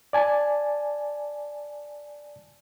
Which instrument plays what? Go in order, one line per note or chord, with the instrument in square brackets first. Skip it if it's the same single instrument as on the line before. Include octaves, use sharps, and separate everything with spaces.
[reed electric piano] D5 G#5 A5